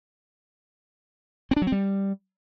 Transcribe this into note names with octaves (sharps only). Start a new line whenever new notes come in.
C4
D4
F#3
C4
G3